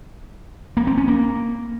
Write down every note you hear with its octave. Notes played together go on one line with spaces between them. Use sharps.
A#3
C4
C#4
A#3